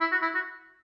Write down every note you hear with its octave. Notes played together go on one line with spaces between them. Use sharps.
E4
F#4
E4
F#4